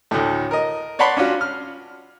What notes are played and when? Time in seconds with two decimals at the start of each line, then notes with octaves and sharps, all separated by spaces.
0.11 D2 A2
0.51 A#4 D#5
0.99 C#5 D5 F#5 A5 B5 C6
1.17 C#4 D4 F4 F#4
1.41 F6